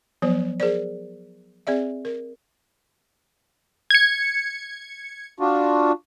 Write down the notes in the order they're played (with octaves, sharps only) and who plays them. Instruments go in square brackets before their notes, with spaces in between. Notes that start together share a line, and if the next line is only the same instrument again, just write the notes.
[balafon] F3 F#3 B3 C5
G#4 A#4 C5 D5
C4 G#4 D5 E5
A#4
[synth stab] G#6 C#7
[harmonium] D4 F4 F#4